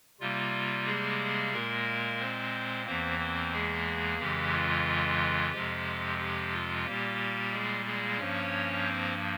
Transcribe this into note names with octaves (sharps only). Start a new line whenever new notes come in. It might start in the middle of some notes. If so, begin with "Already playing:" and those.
C3 G3 A#3 F4
G#3 G#4
A#2 G#3 A#3 A#4
C4 C5
E2 E3 A#3 C4 C5
C4 C5
G#3 G#4
F2 C#3 E3 G#3 G4
F4
F2 C3 F3 G#3 G4
G4
F4
A#2 G3 A#3 G4
G#3 G#4
G#3 G#4
G2 F3 A#3 C#4 C#5
C4 C5